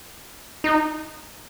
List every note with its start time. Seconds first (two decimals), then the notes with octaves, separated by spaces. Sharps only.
0.64 D#4